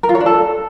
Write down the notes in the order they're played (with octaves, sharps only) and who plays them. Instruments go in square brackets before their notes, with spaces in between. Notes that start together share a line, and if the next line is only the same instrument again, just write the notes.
[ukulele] A#4
F4
C#5
D4
A4